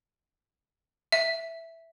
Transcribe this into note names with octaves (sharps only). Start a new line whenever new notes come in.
E5